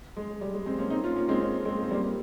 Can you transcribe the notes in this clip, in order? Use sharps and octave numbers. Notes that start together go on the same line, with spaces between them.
G#3
G3
G#3
G#3 C4
A#3 C#4
C4 D#4
C#4 F4
A#3 C#4
G#3 C4
A#3 C#4
G#3 C4
C4
G3 A#3